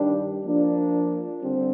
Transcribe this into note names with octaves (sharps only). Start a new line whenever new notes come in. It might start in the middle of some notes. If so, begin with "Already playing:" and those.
Already playing: G2 D#3 G3 D4 G4
F3 A#3 D4
D3 G3 C4